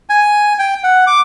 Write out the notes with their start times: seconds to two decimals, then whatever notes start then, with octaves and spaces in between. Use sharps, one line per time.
0.09 G#5
0.59 G5
0.83 F#5
1.07 D6